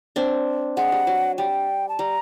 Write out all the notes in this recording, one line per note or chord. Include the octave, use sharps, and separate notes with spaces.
C4 D4
G#3 F#5
G3
F#3
G3 G5
A5
G3 A#5